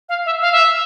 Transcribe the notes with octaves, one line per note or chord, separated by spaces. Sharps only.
F5
E5
F5
E5